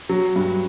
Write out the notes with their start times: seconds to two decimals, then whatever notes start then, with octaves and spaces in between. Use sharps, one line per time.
0.09 F#3
0.36 G2